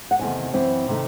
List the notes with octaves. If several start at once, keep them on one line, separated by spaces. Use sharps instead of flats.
F#5
E2 C3 D#3 A3 G#5
F#2 E3 C4 E4
C3 D#3 A3 D#4